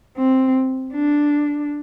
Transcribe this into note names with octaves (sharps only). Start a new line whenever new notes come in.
C4
D4